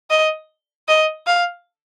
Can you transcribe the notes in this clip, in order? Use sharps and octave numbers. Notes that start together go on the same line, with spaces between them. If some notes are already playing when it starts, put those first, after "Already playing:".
D#5
D#5
F5